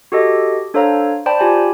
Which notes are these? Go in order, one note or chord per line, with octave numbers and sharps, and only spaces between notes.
F#4 G4 A4 D#5
D4 A4 C5 C#5 F5 A#5
C5 D5 G5 A5 B5
F4 G4 G#5 B5